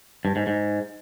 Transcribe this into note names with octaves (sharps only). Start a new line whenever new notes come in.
G2
G#2
G#2